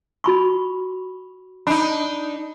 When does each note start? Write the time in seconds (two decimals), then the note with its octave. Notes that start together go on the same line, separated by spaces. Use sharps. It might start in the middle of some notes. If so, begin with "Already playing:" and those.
0.24 F#4 B5 C#6
1.67 D4 D#4 B5